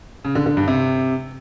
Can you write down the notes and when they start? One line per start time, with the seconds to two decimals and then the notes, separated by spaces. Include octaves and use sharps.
0.24 C#3
0.35 D3
0.46 D3
0.57 G2
0.68 C3